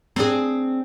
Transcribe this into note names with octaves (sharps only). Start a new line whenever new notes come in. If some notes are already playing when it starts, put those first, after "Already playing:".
C4 D4 G#4